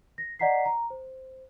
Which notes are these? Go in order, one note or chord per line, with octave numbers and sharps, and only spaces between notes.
A#6
D5 D#5 F#5 A#5 B6 C7
A#5
C5